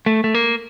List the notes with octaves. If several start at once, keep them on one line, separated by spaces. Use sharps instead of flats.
A3
A3
A#3